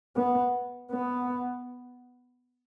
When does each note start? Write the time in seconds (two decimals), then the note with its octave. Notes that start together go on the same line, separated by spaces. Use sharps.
0.16 B3
0.91 B3